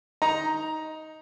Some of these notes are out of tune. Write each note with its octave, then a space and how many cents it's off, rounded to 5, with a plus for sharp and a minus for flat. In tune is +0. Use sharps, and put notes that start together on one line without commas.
D#4 +10 A#5 +10